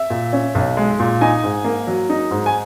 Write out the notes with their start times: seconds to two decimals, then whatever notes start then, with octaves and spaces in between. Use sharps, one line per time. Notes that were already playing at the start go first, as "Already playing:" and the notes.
Already playing: E5
0.10 A#2
0.33 C#4
0.55 B1
0.77 G#3
1.00 A#2
1.21 D#4 G#5
1.44 G#2
1.65 A#3
1.87 F#3
2.10 D#4
2.31 G#2
2.46 G#5